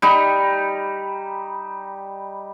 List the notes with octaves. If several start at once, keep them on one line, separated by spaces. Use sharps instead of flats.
G3 D#4